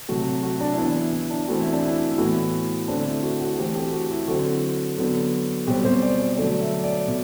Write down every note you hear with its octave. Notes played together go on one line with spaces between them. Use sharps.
C3 F#3 A3 F#4
F#4
D4
E4
E3 B3 D4
E4
E4
D4
E3 A3 C4 F#4
E4
D4
E4
E4
A2 E3 B3 F#4
D3 A3 C4 D4
E4
F#4
F#4
E3 A3 C4 G4
G4
F#4
E4
D3 F#3 C4 F#4
D3 F#3 B3
B2 G3 C4 G4
C5
D5
D5
D3 F#3 A3 D5
E5
D5
B2